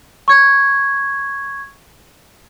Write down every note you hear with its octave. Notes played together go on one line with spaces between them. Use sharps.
C#6 G#6